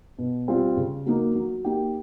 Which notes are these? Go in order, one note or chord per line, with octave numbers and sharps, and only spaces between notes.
B2
G3 C4 F4
C#3
F#3 A#3 D#4
F#3
A#3 D#4 G4